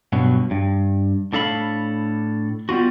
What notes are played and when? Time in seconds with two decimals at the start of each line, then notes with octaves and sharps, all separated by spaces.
0.12 G2 B2 F#3
0.51 G2
1.33 A2 D4 A4 F5 B5
2.69 G3 B3 F4 F#4